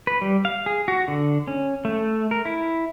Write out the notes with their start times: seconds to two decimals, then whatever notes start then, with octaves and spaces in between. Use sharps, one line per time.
0.07 B4
0.21 G3
0.45 F5
0.66 G#4
0.88 F#4
1.08 D3
1.48 C#4
1.85 A3
2.31 A#4
2.45 E4